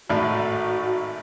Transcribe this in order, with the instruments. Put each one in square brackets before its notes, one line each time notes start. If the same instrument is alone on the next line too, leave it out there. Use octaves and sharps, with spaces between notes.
[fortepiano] G#1 A2 D5 [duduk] F#4